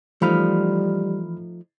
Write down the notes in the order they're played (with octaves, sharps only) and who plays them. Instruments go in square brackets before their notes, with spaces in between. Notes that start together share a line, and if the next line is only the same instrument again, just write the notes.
[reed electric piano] E3 B5 F6 [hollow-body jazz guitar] F3 A3 D#4 [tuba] G3